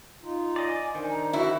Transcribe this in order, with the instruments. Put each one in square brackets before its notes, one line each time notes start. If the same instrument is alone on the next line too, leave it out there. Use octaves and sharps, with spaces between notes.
[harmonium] D#4 F4
[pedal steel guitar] D5 D#5 [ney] G#5
[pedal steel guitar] D#3 [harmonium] D4 C5
[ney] A#5
[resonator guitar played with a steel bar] E4 [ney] F#4